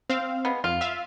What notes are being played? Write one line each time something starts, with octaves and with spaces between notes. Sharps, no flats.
C4 F5
G#3 B3
F2 F4
E5 F5